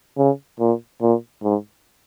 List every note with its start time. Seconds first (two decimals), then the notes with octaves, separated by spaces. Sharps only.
0.17 C#3
0.60 A#2
1.02 A#2
1.43 G#2